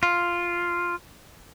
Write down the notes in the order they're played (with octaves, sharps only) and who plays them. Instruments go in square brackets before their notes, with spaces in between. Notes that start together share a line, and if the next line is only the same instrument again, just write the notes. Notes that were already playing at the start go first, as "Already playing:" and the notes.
[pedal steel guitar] F4